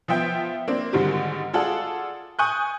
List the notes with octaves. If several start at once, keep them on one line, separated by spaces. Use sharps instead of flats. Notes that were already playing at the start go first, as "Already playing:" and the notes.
F3 B3 E5 G5 G6
A#3 C4 D4
G#2 D3 D#3 G3 G4
F4 G#4 A4 D5 F#5
G#5 C#6 D#6 F#6 G6